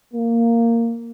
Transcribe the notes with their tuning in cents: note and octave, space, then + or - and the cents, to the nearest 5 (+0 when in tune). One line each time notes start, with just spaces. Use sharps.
A#3 -10